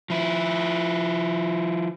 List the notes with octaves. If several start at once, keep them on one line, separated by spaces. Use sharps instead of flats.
F3 E4